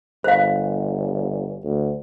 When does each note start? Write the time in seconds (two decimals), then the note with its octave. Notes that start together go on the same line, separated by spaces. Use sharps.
0.24 G1 C5 F5
1.64 D2